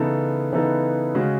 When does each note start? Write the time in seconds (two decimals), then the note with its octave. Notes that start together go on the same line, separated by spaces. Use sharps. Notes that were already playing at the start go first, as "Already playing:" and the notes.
Already playing: C#3 E3 B3 D#4 A4
0.52 C#3 E3 B3 D#4 A4
1.15 C#3 G#3 C#4 F#4